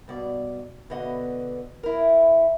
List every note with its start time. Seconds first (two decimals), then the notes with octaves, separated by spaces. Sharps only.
0.08 G2 B2 D5
0.90 B2 D3 D#5 F#5
1.83 E4 A#4